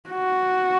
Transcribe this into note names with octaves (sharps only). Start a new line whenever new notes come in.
F#4